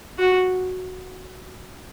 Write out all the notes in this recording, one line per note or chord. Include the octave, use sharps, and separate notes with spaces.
F#4